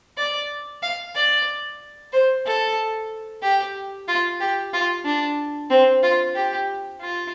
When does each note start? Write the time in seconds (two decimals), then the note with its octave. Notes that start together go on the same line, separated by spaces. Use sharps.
0.18 D5
0.83 F5
1.15 D5
2.13 C5
2.46 A4
3.43 G4
4.08 F4
4.40 G4
4.73 F4
5.05 D4
5.70 C4
6.03 F4
6.36 G4
7.01 F4